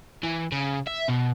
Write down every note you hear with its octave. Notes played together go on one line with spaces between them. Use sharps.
E3
C#3
E5
B2